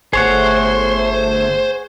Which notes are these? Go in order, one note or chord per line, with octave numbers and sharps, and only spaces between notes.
G1 A3 G#4 C5 C#5 F#5